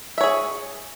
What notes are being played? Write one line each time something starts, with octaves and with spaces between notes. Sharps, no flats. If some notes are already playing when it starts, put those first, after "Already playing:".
G#4 C#5 E5